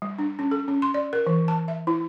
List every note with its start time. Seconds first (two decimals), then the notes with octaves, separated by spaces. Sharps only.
0.02 G3
0.18 D4
0.39 C#4
0.51 A4
0.68 C#4
0.82 C6
0.94 D5
1.13 A#4
1.27 E3
1.48 A5
1.68 E5
1.87 E4